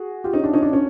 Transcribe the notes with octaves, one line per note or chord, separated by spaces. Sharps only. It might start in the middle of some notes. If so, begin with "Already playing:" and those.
Already playing: F#4 G#4
F4 G4
C#4 D#4
D4
C#4 D#4
D4
C#4